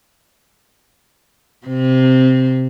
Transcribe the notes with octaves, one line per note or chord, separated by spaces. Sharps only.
C3 C4